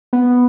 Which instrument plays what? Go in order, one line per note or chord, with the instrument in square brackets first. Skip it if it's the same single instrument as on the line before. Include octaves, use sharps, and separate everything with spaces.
[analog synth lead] B3